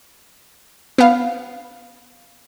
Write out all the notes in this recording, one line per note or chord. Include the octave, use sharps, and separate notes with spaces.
B3 F5